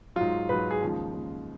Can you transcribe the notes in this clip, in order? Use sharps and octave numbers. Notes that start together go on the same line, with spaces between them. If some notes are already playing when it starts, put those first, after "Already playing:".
G#2 F#3 F4
G#2 F#3 B4
G#4
D#2 C#3 F3 G#3
D#2 C#3 F3 G#3